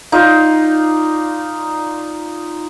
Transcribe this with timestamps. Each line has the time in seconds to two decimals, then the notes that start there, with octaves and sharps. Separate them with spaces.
0.12 D#4 F4 D5